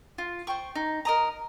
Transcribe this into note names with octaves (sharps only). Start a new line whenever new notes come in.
F4
C5 G5 C#6
D#4
A#4 D#5 A#5